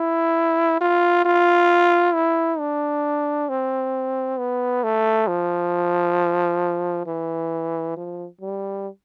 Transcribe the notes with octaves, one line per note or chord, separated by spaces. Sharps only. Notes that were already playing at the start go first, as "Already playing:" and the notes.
Already playing: E4
F4
F4
E4
D4
C4
B3
A3
F3
E3
F3
G3